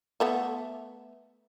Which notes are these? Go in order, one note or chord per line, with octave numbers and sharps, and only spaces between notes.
A3 B3 E5